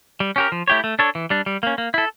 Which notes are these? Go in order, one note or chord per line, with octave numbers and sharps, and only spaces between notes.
G3
C#4 G4 A#4
F3
A3 E4 G4 C#5
A3
D4 A4 C#5
E3
G3 D4
G3
A#3 C#4
A#3
E4 A4